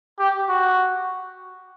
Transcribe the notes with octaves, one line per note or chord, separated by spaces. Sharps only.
G4
F#4